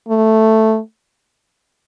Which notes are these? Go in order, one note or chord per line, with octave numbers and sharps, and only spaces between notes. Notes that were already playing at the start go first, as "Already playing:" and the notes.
A3